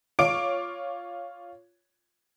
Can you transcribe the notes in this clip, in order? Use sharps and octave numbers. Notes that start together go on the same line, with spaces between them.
F4 C#5 D6 D7